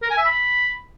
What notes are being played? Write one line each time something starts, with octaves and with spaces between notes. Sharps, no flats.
A#4
G#5
E5
B5